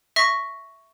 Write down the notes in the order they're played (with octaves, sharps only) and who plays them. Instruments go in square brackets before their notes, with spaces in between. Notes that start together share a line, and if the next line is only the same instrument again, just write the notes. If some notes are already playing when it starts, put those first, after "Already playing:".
[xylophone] E5 C#6 A#6